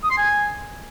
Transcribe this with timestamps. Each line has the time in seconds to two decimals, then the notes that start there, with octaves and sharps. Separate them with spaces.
0.04 D#6
0.11 C6
0.18 G#5